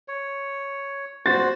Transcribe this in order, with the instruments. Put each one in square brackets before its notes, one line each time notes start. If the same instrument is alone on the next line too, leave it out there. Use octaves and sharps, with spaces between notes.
[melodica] C#5
[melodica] F#4 C5 [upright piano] A6